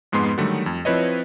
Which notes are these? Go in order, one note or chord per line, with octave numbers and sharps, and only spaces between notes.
F2 G#2 G#3 B3 C6
D3 D#3 F#3 G3 A3
F2
F3 C4 E4 B4 C#5 D#5